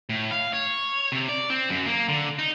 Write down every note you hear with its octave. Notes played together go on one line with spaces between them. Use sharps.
A2
F5
C#5
C3
D5
C4
F#2
A#3
D3
D#4